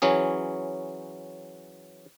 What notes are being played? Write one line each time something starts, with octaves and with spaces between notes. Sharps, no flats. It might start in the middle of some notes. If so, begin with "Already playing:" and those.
E3 F#3 C#4 G#4